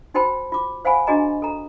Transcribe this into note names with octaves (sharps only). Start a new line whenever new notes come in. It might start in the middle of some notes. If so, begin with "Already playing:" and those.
D#4 F#4 C5 G5 A5 B5
F4 D6
C5 F5 F#5 G#5 B5
D4 F#4 G#4 D#5 A#5
A4 A#5